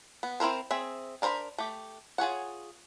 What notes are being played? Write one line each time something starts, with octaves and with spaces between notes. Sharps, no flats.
B3
C4 E4 A#4 C5
C4 G#4 E5
D4 A#4 C5 A#5 B5
A3 G4
F4 G#4 C#5 F#5